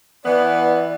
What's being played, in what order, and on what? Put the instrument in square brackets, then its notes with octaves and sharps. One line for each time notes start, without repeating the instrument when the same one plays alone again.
[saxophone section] E3 B3 [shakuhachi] D5